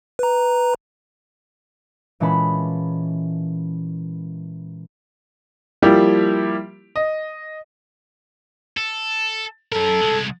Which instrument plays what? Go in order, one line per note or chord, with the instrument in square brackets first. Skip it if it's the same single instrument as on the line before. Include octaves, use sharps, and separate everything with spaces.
[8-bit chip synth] B4 A#5
[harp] A#2 E3 G#3 C#4 A5 B5
[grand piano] F3 G3 A#3 E4 G4
D#5
[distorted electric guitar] A4
[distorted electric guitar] F#2 A#4 [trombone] A4
[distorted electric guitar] C2 G#3